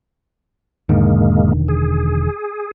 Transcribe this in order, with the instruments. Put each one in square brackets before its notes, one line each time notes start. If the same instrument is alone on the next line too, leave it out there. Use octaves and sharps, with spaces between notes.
[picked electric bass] E1 D3 D#3 [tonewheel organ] G#2 G#3 A#3
[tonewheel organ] G#4